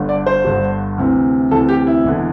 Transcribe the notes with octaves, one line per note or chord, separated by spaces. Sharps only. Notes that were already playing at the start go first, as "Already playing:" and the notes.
Already playing: G1 G2 D3
D5
C5
G1 G2 D3
D2 C3 E3
D2 C3 E3 A4
G4
E4
E1 E2 D3